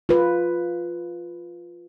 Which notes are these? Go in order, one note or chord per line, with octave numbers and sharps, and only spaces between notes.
F4 B4